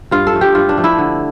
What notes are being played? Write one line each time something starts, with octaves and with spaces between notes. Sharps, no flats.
G2 F4
A4
F3 A3
G4
G2 F4
D4
F3 A3
E4
D3